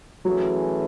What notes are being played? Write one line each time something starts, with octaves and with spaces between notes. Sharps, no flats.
E3 F#3 A3 C#4 G#4